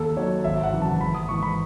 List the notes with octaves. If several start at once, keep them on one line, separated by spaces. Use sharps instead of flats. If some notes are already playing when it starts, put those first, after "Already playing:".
Already playing: D#2 A4
D#3 F#3 C#5
G#1 E5
F#5
F#2 C#3 E3
A5
G#1 B5
D#6
G#2 E3 C#6
B5